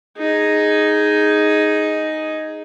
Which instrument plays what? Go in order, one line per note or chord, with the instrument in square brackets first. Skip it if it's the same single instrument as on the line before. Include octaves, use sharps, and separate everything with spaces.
[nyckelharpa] D#4 G#4